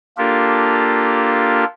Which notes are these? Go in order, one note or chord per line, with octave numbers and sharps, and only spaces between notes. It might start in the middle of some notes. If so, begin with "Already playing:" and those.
A#3 D4 F4 G4 A4 A#4